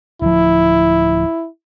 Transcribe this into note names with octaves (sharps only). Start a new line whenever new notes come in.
D1 F3 E4